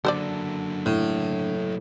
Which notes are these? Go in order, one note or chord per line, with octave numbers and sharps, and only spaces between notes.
D3 F#3 A#3 A4 C5 D5
A2